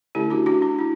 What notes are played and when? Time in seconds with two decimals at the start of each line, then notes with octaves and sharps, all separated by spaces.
0.15 D3 A3 C#4 E4 G4
0.30 D4 F#4
0.46 D4 F#4
0.62 D4
0.79 E4